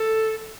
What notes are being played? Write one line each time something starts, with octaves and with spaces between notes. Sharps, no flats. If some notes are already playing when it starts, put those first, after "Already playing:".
Already playing: A4